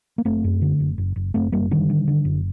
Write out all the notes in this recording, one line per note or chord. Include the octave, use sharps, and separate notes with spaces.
A#3
F#1 A3 C4
F#2
D3
F#1
F#1
F#1
F#1 A3 C4
F#1 G3 A#3
D3 D#3 G3
D3
D3
F#1